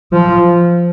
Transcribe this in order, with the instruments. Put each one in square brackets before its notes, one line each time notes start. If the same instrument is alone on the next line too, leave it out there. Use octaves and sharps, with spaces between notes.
[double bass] F3